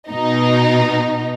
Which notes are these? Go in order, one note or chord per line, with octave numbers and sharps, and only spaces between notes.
B2 D#4